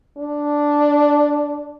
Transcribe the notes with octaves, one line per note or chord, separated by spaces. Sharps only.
D4